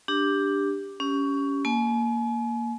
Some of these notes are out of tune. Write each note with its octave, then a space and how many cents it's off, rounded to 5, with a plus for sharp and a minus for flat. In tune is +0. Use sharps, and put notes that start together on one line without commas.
D4 +0 G4 +10
C#4 +15 G4 +0
A#3 +0 G#5 +40